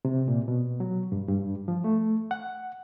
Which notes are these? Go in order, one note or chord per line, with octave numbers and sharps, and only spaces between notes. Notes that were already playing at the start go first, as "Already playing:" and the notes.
C3
A#2
B2
F#3
G2
G2
F3
A3
F#5